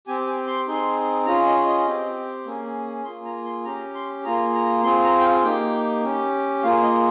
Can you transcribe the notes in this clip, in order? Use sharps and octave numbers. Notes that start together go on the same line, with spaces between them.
C4 G4 G#5
G#5
C6
C4 D#4 G#4
C6
C#4 F4 G#4 A#5
D#5
D#5
C4 G4
A#3 C#4 G#4
A#3 F4 G#4 C6
A#5
C6
C#4 G4 A#5
C6
A#3 F4 G#4 A#5
A#5
C4 F4 G#4 C6
A#5
G5
F5
A#3 D#4 G4 G5
C#4 G4
A#3 F4 G#4 F5
D#5